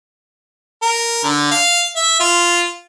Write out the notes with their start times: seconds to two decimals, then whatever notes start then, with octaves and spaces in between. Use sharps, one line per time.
0.82 A#4
1.24 D3
1.51 F5
1.96 E5
2.20 F4